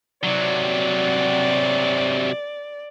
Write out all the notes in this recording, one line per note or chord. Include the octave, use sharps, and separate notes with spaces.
C3 F#3 D5